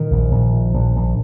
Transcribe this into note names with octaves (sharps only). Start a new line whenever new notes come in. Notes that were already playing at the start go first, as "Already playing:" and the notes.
Already playing: A#2 D#3
A#1
A#1
A#2
A#1
A#1